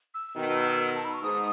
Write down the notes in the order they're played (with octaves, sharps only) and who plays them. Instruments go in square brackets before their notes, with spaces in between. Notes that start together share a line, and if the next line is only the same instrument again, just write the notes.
[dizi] E6
[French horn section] B2 D#3
[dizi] A5
B5
C#6
[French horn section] G#2 [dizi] D#6